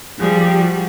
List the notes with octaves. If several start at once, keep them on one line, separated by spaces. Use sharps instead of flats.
F3 G3 G#4
G4
F#4